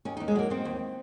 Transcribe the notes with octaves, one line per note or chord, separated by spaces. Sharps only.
D#2 C#4
D#2 D#4
G#3
F#3 A#3
D#3 C4
D#2